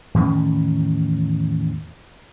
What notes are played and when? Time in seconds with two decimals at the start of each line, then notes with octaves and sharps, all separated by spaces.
0.14 E2 A2 D#3 C#4